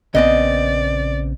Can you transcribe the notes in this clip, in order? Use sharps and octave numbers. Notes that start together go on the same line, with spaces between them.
A#1 C#3 B3 C4 D5 D#5